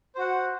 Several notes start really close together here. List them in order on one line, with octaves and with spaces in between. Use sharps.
C5 F#4 F#5